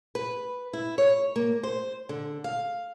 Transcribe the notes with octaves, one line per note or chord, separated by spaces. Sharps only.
B4
E4
C#5
A#3
C5
D3
F5